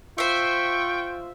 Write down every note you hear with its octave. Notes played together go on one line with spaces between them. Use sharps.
F4 C5 E5 G5 C#6